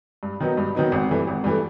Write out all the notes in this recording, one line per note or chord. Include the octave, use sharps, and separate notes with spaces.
G2
D#3 F#3 B3 D#4
G2
D#3 F#3 B3 D#4
G#1
G2 E3 A3
G#1
G2 E3 A3